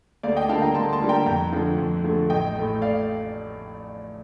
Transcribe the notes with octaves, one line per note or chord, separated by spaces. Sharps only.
D2 D5 F5
D#5 G5
D3 G3 A#3 F5 A5
G5 A#5
D2 A5 C6
A5 C6
D3 G3 A#3
G5 A#5
F2 G5 A#5
D3 F3 A3
F2
D3 F3 A3
A1 D#5 G5
A2 A3
D5 F5